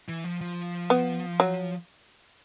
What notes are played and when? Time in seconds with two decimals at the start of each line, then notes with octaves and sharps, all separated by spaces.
0.08 E3
0.24 F3
0.41 F3
0.90 B3
1.40 F#3